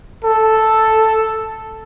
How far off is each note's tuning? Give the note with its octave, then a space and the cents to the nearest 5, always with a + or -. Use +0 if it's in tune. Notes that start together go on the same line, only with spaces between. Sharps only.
A4 +0